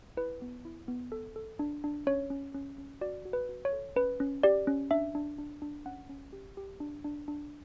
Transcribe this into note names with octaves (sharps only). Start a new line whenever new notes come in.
E4 B4
B3
E4
B3
A4
A4
D4
D4
C#4 C#5
C#4
C#4
C#4
F#4 D5
F#4
B4
F#4
C#5
A4
C#4 B4
C#4
G4 D5
C#4
D4 E5
D4
D4
D4
C#4 F#5
C#4
G4
G4
D4
D4
D4